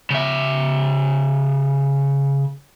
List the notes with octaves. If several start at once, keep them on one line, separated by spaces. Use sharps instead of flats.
C#3 E5